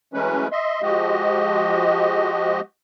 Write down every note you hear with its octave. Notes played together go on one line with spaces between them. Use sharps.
E3 F#3 G#3 A3 C#4 B4
D#5 E5 C6
F3 G#3 F#4 G4 D#5